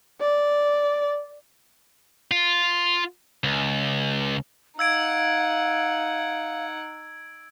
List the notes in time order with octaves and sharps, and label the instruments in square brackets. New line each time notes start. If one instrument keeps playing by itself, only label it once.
[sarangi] D5
[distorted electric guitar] F4
C#2
[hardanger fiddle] D#4 F#5 [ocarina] F5 [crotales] E6 G#6 D7